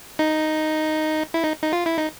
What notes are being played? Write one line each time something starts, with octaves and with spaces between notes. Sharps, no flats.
D#4
E4
D#4
D#4
F4
E4
D#4